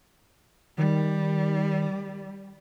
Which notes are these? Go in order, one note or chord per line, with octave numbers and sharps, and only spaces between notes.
D#3 G3